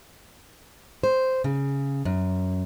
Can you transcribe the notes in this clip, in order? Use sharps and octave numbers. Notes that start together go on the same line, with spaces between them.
C5
C#3
F#2